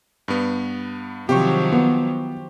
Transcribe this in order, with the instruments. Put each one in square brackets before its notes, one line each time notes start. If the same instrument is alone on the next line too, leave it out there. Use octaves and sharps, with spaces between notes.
[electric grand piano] G2 B3
[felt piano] C3 [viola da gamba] D#3 F3 F#3 [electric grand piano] G4 C5 C#6
[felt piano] B3